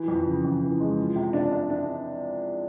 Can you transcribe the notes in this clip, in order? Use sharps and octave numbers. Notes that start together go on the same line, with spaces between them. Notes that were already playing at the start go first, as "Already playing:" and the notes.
Already playing: E3
F2
C#3
F2
E3
G#3
F3
C3
D4
D4
D4